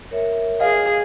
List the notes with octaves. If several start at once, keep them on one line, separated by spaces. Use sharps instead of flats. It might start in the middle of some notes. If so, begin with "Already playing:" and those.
A#4 C#5 E5
G#4 D#5 F5